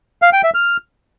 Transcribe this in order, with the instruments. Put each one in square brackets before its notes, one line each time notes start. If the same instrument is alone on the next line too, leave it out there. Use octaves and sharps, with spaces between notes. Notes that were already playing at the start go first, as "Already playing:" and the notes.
[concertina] F5
G5
E5
F6